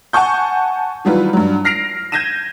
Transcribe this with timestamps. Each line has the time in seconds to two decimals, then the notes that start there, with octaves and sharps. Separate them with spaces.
0.13 F#5 G#5 A5 C#6 G6
1.05 D#3 E3 F#3 G3 F4 B4
1.33 G2 F#3
1.65 F6 A#6 C7 D7 F7
2.12 G6 G#6 A#6 D#7 E7